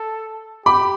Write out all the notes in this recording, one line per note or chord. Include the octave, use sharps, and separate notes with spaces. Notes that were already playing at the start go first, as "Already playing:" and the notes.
Already playing: A4
G4 B5 D6